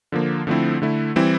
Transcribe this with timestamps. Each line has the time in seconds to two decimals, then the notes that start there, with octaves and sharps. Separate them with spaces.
0.12 D3 F3 A#3
0.47 D3 F3 A3 C4 E4
0.82 D3 A3 E4
1.16 E3 G3 C4 E4